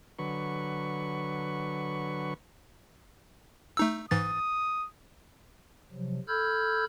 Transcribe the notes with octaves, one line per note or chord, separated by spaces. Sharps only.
D3 F#3 B4 C#6
A3 D#4 E6
G#2 E3 D#6 A6
C3 F3 F#3
A4 B5 E6 F6 G6 G#6